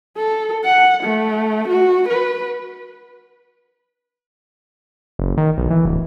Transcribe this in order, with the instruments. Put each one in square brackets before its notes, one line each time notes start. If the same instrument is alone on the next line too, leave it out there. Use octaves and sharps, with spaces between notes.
[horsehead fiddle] A4
F#5
A3
F#4
B4
[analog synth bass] F#1
D#3
B1
E3
D1